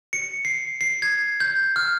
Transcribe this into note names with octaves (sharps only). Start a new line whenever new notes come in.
C#7
C7
C7
G#6
G6
F6